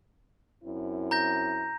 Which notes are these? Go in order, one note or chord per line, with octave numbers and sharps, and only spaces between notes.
F#2 C4 E4
A#5 G6 A#6